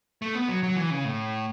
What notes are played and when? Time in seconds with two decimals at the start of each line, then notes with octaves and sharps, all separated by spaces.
0.22 A3
0.35 B3
0.49 F#3
0.63 F#3
0.76 E3
0.90 C#3
1.05 A2